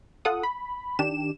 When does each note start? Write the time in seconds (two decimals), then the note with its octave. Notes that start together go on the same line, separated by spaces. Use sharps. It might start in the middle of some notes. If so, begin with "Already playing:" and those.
0.25 F4 A4 F#5 D#6
0.43 B5
0.99 D#3 D4 G4 E7